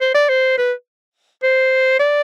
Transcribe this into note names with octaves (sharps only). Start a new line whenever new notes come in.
C5
D5
C5
B4
C5
D5